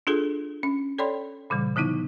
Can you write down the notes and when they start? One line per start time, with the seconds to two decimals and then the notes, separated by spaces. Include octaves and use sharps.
0.07 D4 F4 G#4 A4
0.63 C#4
0.98 A4 C#5 D5 G5 B5 C6
1.50 A#2 C#3 E3 G3
1.76 D3 F3 B3 D#4 E4